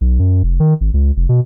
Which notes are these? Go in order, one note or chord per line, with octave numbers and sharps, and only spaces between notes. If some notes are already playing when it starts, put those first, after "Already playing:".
B1
F#2
F1
D#3
G#1
C#2
F1
B2